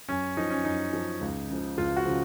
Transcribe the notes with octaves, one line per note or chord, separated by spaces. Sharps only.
F#2 C#4
F3 D#4
C#4
F#2 D#4
F3
C#2
C#3 F3
C#2 F4
F#4
C#3 F3